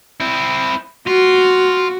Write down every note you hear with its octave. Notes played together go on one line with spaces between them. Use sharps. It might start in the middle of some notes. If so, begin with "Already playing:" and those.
C4 E4
F4 F#4